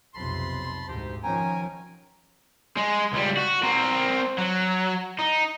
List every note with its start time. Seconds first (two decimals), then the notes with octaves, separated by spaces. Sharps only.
0.15 B1 F2 C3 A5 B5 C6
0.88 D2 G#2 D#4 G4 C5
1.23 D#3 F3 C#4 G5 G#5 A#5
2.77 G#3
3.13 C#2 G3
3.37 F#4
3.63 C4 A#4
4.38 F#3
5.19 D#4